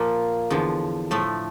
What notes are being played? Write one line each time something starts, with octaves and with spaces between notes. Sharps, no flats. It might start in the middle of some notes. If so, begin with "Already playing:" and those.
Already playing: A#2 F3 A#3
E2 D3 F3
A2 F3 A3